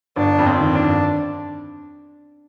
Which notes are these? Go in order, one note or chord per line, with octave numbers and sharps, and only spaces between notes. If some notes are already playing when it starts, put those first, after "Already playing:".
G1 D4
F2
C4
D#3
D4
G1